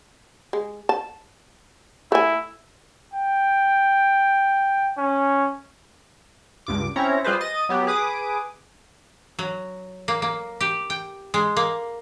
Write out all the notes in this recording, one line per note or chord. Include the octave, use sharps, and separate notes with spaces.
G#3
A5
A3 E4 G#5
G5
C#4
C#2 G2 D6
C4 C#4 E4 C#5 A#5
G3 F4 G#4 B4 C5
D#5 A6 D#7
F#3 B3 G4
G#4 B4 D6 D#6
F#3
A#3
A#3
G4
G5
G#3
A#3